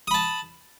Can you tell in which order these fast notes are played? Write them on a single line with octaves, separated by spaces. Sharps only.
D#6 B5 A5